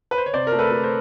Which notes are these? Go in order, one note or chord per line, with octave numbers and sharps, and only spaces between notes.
B4
C5
C#5
C3 C5 D5
A#4
A3
A4 B4
A3
A#4 C5